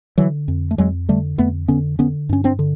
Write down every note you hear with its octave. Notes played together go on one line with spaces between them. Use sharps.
D3 E3 F#3
F2
A3
F2 F#3 G#3
D3 G3 A3
F2 A3 B3
D3 B3 C#4
D3 B3 C#4
G2 C#4
C4 D4
D3